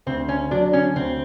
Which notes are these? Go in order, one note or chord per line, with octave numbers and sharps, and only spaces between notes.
D2 C4
C#4
D3 F#3 D4
C#4
D2 C4